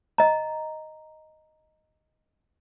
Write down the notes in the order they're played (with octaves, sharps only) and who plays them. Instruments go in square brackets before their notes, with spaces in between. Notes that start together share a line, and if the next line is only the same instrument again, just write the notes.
[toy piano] D#5 A#5